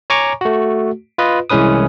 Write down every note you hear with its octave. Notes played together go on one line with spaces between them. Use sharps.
C#5 G#5 A#5 C#6 D6
A3 F#4
F4 B4 D#5
C2 E3 G#3 C#4 B4 D#6